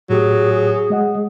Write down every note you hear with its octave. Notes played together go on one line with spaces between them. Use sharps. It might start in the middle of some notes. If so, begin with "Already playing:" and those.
A2 F#3 G4 G#4
G#3 D#5 F#5